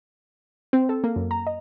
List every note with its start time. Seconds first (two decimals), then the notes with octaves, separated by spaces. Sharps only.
0.73 C4
0.89 A4
1.04 A#3
1.16 F#2
1.31 A#5
1.47 D#5